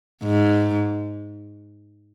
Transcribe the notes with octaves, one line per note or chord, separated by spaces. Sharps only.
G#2